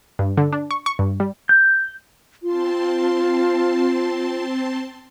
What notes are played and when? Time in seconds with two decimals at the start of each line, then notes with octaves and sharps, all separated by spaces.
0.19 G2
0.37 D3
0.53 D4
0.71 C#6
0.86 C#6
0.99 G2
1.20 G3
1.49 G6
2.43 C4 F4 A5 C6